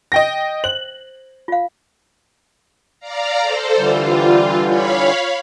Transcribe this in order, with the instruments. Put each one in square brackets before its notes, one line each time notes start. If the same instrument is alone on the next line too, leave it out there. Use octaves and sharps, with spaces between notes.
[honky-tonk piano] D#5 G5 A#6
[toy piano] C5 [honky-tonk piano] F#7
[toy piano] F4 F5
[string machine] D5 F5 A#5
A4 C5
[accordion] D3 E3 G3 [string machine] F4
[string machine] C#5 F5 B5